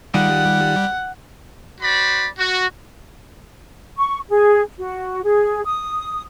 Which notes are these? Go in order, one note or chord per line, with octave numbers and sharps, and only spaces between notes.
D#3 G3 F4 G#4 F#5
F#4 C5 D5 B5
F#4
C#6
G#4
F#4
G#4
D#6